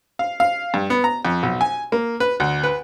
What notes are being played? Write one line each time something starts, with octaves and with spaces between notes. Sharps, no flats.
F5
F5
G2
B3
A#5
F2
B1
G#5
A#3
B4
D2
B4